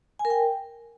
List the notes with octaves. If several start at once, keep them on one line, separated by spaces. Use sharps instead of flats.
G#5
A#4
G5